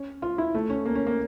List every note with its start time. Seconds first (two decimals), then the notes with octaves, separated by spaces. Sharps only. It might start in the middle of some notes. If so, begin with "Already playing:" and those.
Already playing: C#4
0.22 F4
0.38 E4
0.55 A3
0.70 C#4
0.85 A#3
0.95 C#4
1.07 A#3